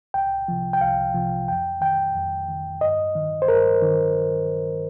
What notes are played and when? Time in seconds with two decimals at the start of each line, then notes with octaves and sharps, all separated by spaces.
0.14 C2 G5
0.48 C3 F3
0.73 G5
0.81 C2 F5
1.14 C3 F3
1.48 F2 G5
1.81 D#3 G5
2.15 F2
2.48 D#3
2.81 G2 D#5
3.15 D#3
3.42 C5
3.48 G2 A#4
3.82 D#3